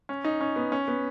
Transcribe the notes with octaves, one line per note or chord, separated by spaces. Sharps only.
C#4
D#4
C#4
B3
C#4
B3